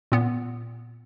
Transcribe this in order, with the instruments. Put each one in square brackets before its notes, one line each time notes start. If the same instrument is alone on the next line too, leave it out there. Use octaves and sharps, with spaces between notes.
[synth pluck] A#2 B3